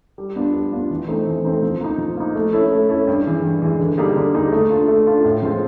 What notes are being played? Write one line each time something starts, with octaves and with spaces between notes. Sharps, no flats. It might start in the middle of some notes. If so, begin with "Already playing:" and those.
G3
B3 D4 F4
G3
B3 D4 F4
E3
A3 C4 D#4
E3
A3 C4 D#4
F3
A#3 D#4
F3
A#3 D#4
A3
C#4 E4 A4
A3
C#4 E4 A4
G2
E3 G#3
G2
E3 G#3
D3
G3 A#3 D#4 G#4
D3
G3 A#3 D#4 G#4
A3
D4 F4
A3
D4 F4
A2
F3 G#3 C4 F4